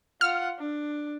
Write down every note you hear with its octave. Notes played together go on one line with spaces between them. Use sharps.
F4 F#5 F6
D4